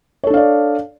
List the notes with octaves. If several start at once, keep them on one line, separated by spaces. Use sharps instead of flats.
D4 A4 C#5 D5 F5